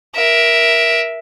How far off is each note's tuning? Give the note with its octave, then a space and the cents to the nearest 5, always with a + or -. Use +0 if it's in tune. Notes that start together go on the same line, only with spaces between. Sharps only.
A#4 +20 E5 +0